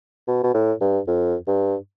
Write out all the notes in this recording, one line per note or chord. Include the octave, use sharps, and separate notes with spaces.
B2
B2
A2
G2
F2
G2